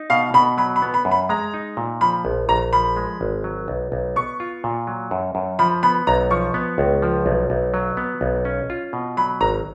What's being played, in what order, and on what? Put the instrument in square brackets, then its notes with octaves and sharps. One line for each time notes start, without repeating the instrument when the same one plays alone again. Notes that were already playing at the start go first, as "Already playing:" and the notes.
Already playing: [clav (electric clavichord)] D#4
[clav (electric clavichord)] B2 [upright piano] F5
[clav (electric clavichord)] B2 [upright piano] B5
[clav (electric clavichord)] F#3 [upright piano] B5
[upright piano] B5
[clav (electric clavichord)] B3
[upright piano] B5
[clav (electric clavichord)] F#2
[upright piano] B5
[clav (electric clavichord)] G#3 [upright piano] A#5
[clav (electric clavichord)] D#4
A#2
[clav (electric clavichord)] F3 [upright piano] B5
[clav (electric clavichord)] A#1
[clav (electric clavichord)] A#1 [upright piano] A#5
[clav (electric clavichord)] F3 [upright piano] B5
[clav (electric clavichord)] G#3
G#1
F#3
B1
B1
[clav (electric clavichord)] B3 [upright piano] C#6
[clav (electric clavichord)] F4
A#2
F#3
F#2
F#2
[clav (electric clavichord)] F3 [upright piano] B5
[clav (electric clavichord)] B3 [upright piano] B5
[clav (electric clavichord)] B1 [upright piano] A#5
[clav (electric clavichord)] F3 [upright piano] C#6
[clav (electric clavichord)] B3
C#2
F3
B1
B1
F#3
B3
B1
C#4
F4
B2
[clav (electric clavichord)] F#3 [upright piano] B5
[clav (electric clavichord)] G#1 [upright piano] A#5